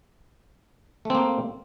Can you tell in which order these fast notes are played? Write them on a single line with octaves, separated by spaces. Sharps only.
A3 C4 A#3